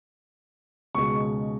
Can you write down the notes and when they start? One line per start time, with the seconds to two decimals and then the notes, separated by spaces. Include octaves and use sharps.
0.95 C#2 B2 G#3 C#6